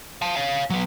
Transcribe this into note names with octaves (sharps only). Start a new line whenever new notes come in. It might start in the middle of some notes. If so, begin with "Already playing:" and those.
F5 A5
C#5 F5
F#3 B3